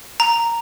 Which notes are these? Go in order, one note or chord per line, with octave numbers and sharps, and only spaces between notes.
A#5